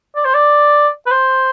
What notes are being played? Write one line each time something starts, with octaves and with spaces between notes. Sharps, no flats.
D5
C5
D5
B4
C5